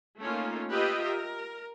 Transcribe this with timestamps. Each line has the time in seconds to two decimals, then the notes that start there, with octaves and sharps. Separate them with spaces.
0.20 A3 A#3 C#4 D#4 F4
0.69 F4 G4 B4 D#5 E5 G5
1.06 A#4